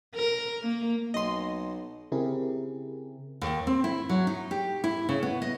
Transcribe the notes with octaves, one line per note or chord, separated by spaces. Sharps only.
A#4
A#3
B1 D#5 C6
C#3 C4 E4 G4 G#4 A#4
D#2
C4
E4
F#3
D#4
G4
E4
C#3
B3
D#5